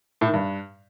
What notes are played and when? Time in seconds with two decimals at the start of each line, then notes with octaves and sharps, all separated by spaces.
0.21 A2
0.28 D#3
0.34 G2